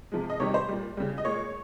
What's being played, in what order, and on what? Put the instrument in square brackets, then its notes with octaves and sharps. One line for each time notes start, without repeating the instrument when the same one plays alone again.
[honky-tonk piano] C3 F3 G#3
D#5
C3 D#3 G3 C#5
C5
A#2 G3
C#3 G3
D#5
A#2 G#3 C#5